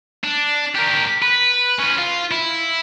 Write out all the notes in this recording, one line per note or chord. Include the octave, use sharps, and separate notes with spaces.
D4
G4 A#4
B4
C#4 B4
F4
E4